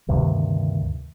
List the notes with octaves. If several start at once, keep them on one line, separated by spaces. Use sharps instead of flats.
D2 G2 C3 D#3